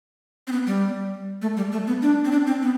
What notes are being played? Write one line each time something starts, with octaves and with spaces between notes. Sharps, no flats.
C4
B3
G3
A3
G3
A3
B3
D4
C4
D4
C4
B3